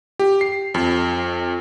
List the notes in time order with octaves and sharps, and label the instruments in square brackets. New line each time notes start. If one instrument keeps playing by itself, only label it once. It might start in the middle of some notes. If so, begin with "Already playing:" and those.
[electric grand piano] G4
C7
F2